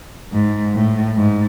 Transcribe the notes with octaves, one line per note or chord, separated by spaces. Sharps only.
G#2
A2
G#2